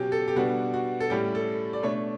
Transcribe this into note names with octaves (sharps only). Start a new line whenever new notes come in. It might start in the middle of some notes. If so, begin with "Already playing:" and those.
Already playing: B2 F#3 C#4 G4
A4
G4
B2 G3 B3 D4 F#4
F#4
A4
A2 G3 C#4 G4
A4
D5
B2 A3 D4 C#5